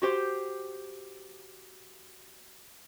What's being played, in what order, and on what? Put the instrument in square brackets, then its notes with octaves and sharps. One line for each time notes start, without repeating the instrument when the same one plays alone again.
[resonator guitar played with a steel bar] F#4 G4 C5